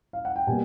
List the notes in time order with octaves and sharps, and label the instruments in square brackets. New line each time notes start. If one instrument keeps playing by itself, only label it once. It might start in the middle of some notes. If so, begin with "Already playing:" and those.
[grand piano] F5
F#5
G5
B2 G3 A#3 G#5